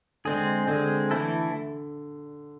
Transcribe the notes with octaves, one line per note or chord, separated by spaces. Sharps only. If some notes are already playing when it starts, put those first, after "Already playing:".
D3 G#3 C4 G#4
D3 G#3 C4 G#4
E3 A3 E4 A4